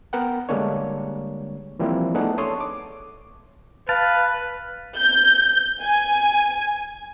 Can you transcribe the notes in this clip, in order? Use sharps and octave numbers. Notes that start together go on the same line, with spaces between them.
B3 A#4 F#5 G5
D3 G3 G#3 A#3 D4 C#5
E3 F3 G3 A#3 C4 E4
A3 B3 D4 D#4 G#4 F#5
A4 C#5 C6 C#6 D#6
D6
B4 F5 A5
G6
G#5